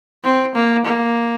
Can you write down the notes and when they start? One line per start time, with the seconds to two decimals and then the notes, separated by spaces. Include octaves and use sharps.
0.24 C4
0.55 A#3
0.86 A#3